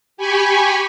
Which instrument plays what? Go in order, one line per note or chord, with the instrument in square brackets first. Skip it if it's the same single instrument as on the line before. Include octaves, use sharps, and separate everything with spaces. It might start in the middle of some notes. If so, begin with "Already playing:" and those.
[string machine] G4 G#5 B5 C#6